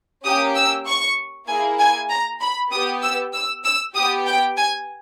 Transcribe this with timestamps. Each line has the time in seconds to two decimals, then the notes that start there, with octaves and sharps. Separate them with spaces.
0.25 A#3 C#4 G4 D#6
0.55 E6
0.87 C#6
1.48 A#3 E4 G#4 G#5
1.79 G#5
2.10 A#5
2.41 B5
2.72 B3 G4 D#6
3.02 E6
3.34 E6
3.64 E6
3.95 B3 G4 D#6
4.26 G5
4.57 G#5